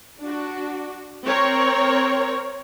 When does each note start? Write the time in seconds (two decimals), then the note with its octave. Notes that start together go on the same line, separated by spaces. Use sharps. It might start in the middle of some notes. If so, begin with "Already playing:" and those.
0.21 D4 F#4
1.26 C4 A#4 C#5